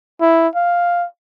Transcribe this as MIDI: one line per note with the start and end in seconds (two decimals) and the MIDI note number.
0.21 0.48 64
0.55 1.05 77